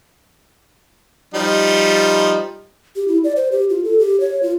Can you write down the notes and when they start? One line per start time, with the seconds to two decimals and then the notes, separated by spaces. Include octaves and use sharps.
1.34 F3 G3 D#4
2.96 G4
3.08 E4
3.24 D5
3.36 C5
3.52 G4
3.70 F4
3.84 A4
3.99 G4
4.20 C#5
4.43 F4